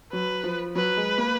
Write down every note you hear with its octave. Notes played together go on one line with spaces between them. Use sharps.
F#3 B4
F3
F#3 B4
G#3
A#3